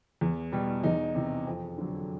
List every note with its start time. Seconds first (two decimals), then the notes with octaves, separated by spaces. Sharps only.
0.21 E2
0.52 B2 G3
0.83 E2 D#4
1.15 C3 E3
1.47 F2
1.78 D3 F#3